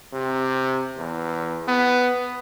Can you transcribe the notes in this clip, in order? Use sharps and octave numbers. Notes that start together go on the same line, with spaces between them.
C3
E2
B3